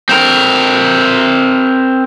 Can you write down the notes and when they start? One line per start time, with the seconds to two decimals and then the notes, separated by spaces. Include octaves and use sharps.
0.09 C4 A#4